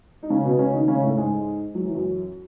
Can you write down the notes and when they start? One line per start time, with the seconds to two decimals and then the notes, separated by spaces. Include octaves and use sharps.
0.23 D#4
0.30 C#3 C#4
0.44 B2 B3
0.59 C#3 C#4
0.73 D#3 D#4
0.88 C#3 C#4
1.03 A2 A3
1.17 G#2 G#3
1.75 F#3
1.85 E3
1.95 F#2 F#3